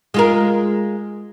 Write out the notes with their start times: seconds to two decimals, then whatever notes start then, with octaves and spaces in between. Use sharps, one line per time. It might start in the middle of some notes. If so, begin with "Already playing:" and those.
0.14 G#3 F4 A#4